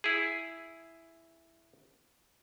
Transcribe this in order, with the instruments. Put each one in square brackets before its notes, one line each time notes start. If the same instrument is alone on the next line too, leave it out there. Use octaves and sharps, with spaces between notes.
[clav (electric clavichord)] E4 G#4